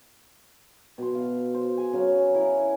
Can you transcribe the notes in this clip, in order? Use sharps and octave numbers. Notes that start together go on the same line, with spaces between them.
B2 C6
F5
C5
G#4 G#5
C#3 F#3 F5
E4 G#4 A#4